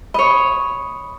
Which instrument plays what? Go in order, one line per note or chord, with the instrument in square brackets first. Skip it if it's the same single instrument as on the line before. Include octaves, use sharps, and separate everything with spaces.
[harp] C#5 D#5 [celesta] B5